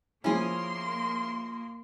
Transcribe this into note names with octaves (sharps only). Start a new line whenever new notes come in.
F3 A#3 C#4 E4 G#4 C6